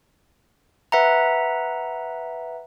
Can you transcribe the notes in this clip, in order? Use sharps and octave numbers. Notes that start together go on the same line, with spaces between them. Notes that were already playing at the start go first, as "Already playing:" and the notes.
B4 E5 F#5 A#5